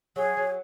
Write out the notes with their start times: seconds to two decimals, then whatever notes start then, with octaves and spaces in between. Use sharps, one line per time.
0.16 F#3 G#4
0.37 F#3